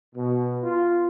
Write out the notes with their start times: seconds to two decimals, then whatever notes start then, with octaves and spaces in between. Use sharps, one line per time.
0.15 B2
0.63 F4